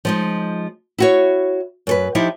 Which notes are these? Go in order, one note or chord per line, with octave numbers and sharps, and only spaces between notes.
F3 G#3 D#4
E4 F#4 C#5
F#2 A4 B4
F3 D#4 E4 G4